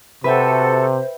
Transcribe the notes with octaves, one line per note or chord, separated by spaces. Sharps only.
C3 F#4 A4 B4 C5 E5 G5